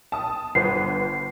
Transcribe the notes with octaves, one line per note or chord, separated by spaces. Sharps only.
A5 D#6
G1 B4 C5 C7